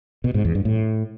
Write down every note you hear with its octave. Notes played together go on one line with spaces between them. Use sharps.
B2
G#2
E2
G2
A2